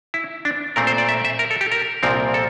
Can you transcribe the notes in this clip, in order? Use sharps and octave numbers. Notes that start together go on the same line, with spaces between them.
E4
D4
A#2 A3 C4 A#4
C5
D5
E5
E5
A#4
A4
G4
A#4
C2 A#2 F3 C4 A#4
A4